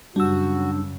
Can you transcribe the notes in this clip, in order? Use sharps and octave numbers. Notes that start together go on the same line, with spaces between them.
F#2 C#3 G3 D4 F#4 E6